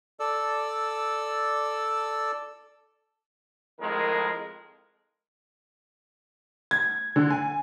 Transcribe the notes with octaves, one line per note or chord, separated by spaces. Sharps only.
A4 D5 E6
F2 A2 D#3 G#3 A#4
G#6
D3
G#5